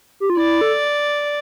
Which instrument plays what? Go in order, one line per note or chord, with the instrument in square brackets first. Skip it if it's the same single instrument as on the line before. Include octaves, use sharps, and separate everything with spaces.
[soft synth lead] G4
F4
[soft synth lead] E4 [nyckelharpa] D5
[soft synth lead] A4